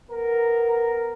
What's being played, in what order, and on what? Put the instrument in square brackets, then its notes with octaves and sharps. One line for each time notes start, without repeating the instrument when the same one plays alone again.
[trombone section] B3 A#4